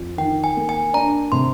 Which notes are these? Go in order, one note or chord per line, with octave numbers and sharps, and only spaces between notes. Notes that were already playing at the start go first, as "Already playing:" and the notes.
Already playing: F2
D#3 G5
G#5
A#3
G#5
D4 A#5
C3 C6